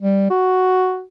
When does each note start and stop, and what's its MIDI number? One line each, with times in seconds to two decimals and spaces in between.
0.02 0.26 55
0.30 1.02 66